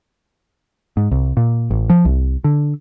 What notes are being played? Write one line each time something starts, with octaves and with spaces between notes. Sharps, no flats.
G#2
C2
A#2
A1
F3
C2
D3